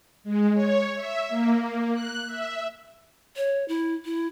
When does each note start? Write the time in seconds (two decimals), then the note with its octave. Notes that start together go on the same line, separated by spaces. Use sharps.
0.24 G#3
0.54 C#5
0.95 E5
1.29 A#3
1.93 F#6
2.26 E5
3.37 C#5
3.68 E4
4.05 E4